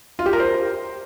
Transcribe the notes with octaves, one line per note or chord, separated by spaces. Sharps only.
F4
G4
A#4
C5